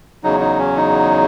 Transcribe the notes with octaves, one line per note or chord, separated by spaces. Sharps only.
E2 C#3 F#3 D#4
D#4
C#4
D#4